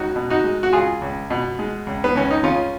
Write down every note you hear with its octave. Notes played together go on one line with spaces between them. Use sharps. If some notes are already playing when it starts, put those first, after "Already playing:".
Already playing: C#2 D#4 F#4
B2
D#4 F#4
G#3
F#4
C#2 F4 G#4
C#2
B2
G#3
C#2
B3
C#2 C#4
D#4
C#3 C#4 F4